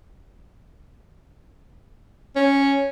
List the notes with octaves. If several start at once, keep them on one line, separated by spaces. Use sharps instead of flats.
C#4